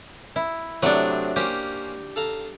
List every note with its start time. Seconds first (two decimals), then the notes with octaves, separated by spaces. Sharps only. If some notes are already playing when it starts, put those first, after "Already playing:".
0.36 E4
0.83 A2 C3 F#3 C4 D4
1.36 A#3 C#4 G4 C5
2.16 A4 F5 A#5